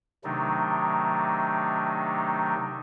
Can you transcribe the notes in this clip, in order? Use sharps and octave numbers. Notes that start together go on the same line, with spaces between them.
C3 D#3 F#3 A3 D4 D#4